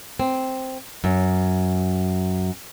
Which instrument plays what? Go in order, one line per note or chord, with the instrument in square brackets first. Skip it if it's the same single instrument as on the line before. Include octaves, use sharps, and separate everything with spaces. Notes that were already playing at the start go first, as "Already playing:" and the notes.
[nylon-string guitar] C4
F#2